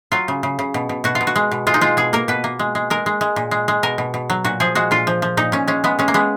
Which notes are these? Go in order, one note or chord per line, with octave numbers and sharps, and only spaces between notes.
F#3 F4
C#3
C#3
C#3
B2
B2
B2 F#4
F4
B2
F#4
G#3
B2
G#3 F4
D#4
G#3 F4
B2 G#4
A#3 A#4
B2 B4
A#3
G#3
G#3
G#3 A#4
G#3
G#3
A#2
G#3
G#3
B2 A#4
B2
B2
F#3
A#2 F#4
F3 G#4
G#3 F#4
A#2 F4
F3
F3
A#2 D#4
A#2 C#4
G#3 C#4
G#3 B3
G#3 C#4
A#3
G#3 B3